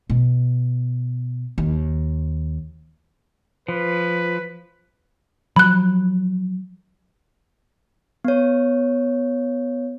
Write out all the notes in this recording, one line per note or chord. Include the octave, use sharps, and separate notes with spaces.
B2
D#2
F3 B4
F3 F#3 B5 F#6
B3 C#5